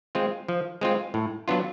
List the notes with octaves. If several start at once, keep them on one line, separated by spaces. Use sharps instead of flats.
G#3 C4 F4
F3
G#3 C4 F4
A2
F#3 B3 D4 F4